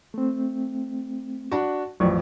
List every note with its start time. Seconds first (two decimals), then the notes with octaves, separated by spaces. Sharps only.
0.14 A3 C4
1.51 D4 F#4
2.00 A1 F2 F#3 D5 C#6